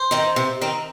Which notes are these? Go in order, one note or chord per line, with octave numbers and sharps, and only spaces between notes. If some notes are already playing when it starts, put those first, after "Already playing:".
Already playing: C5
D#3 C4 D#4
C3
D#3 C4 D#4